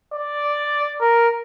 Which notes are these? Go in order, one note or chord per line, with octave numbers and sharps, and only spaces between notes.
D5
A#4